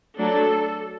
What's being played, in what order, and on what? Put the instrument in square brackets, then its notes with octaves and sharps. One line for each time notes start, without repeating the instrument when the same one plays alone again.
[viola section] F#3 A3 D4 A4